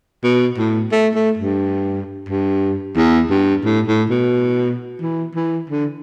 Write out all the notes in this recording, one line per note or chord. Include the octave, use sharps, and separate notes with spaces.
B2
A2
A3
A3
G2
G2
E2
G2
A2
A2
B2
E3
E3
D3